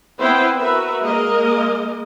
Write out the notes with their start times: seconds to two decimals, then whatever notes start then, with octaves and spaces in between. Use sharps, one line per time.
0.18 B3 C4 E4 B4 C5 G5
0.56 F#4 A#4 B4 E5
1.02 G#3 A#3 A#4 D#5